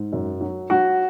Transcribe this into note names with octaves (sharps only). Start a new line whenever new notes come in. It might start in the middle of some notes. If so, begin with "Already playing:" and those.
Already playing: G#2
F#2
F#3
F#3 F#4